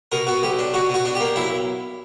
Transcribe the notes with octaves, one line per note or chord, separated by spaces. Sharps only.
B2 A#4
B2 F#4
B1 G4
D4
B2 F#4
B2 F#4
D4
G4
A#3
B1 E4